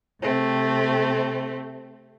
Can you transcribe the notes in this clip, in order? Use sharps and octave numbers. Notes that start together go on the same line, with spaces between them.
C3 A3 C4